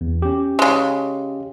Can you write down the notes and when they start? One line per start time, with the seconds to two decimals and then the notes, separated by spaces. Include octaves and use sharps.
0.01 E2
0.22 C#4 G4
0.59 C#3 G#3